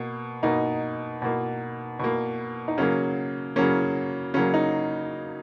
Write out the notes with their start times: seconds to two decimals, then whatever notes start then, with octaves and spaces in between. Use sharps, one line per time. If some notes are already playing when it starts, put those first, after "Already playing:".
Already playing: B2 A#3
0.43 B2 A#3 D#4
1.22 B2 A#3
1.99 B2 A#3
2.68 D#4
2.78 C#3 F#3 A#3 C#4
3.56 C#3 F#3 A#3 C#4
4.34 C#3 F#3 A#3 C#4
4.54 D#4